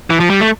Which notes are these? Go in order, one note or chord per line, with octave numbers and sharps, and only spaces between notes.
E3
F3
G3
A3